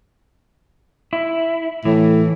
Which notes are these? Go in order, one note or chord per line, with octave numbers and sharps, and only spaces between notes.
E4
A2 E3